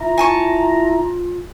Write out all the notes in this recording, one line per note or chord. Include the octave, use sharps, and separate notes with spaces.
E4 F4 A#5
G#5 A5 C#6